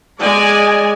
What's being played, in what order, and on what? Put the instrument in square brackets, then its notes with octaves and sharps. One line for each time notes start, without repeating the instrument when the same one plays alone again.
[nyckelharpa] G#3 [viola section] D5 G#5